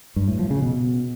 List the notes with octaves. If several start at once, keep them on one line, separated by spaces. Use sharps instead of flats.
G2
A2
F3
C#3
B2